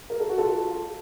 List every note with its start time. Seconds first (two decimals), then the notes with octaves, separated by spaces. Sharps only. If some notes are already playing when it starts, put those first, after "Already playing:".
0.10 A#4
0.20 A4
0.29 F#4
0.38 F4 A4